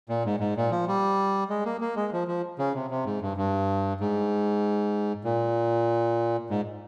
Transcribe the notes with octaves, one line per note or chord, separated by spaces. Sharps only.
A#2
G#2
G#2
A#2
F3
G3
G#3
A#3
A#3
G#3
F3
F3
C#3
C3
C3
G#2
G2
G2
G#2
A#2
G#2